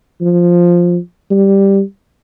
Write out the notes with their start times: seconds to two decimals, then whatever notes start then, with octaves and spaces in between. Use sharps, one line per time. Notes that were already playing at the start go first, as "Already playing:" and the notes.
0.21 F3
1.30 G3